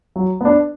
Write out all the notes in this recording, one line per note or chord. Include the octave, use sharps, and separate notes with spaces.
F#3
B3 D4